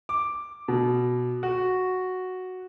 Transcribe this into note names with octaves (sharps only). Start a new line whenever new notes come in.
D6
B2
F#4